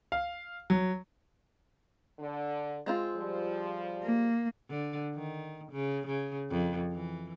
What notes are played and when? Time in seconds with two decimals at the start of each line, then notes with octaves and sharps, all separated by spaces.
0.12 F5
0.70 F#3
2.19 D3
2.86 G#3 C4 F4
3.16 F3 G3
4.03 A#3
4.70 D3
5.14 D#3
5.72 C#3
6.07 C#3
6.51 F2
6.92 E3